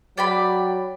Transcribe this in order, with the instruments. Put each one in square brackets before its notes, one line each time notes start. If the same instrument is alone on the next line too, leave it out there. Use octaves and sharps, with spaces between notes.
[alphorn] F#3 [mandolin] D5 G5 B5